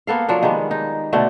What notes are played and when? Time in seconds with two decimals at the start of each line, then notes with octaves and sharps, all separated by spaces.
0.07 A#3 B3 A4 F5
0.29 F3 F#3 D4
0.42 D#3 G3 G#3 B3
0.71 D#4
1.13 B2 D3 A3